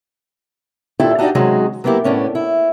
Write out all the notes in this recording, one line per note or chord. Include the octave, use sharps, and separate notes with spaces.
D#2 A#2 E4 F4 A4 G5
D4 D#4 F#4 G4 D5 D#5
C3 D#3 F#3 G#3 C#4 F#4
F#3 A#3 B3 E4 G4
A2 B3 C#4 D4
E4